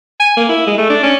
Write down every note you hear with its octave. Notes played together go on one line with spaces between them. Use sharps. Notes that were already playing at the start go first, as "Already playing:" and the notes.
G#5
A#3
E4
G#3
A3
D4
C#4